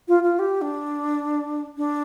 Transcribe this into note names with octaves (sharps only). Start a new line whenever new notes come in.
F4
F4
G4
D4
D4